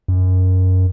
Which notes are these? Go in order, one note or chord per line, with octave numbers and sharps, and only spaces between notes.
F#2